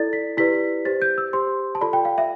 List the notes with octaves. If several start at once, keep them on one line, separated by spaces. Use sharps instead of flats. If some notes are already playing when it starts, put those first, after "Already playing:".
Already playing: E4 A4 D5 A6
B6
E4 G4 B4 D5 B6
G4 C5 A6
G6
E6
G4 C5 C6
A5
F4 A4 D5 B5
G5
F5
E5